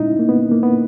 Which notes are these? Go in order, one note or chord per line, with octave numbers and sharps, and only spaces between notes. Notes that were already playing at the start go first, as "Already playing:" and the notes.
Already playing: A#2 G#3 C#4 D#4 E4
A#3
B3
A#3
B3